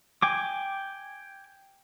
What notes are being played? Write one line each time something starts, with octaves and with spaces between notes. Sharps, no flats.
G5 G#5 D6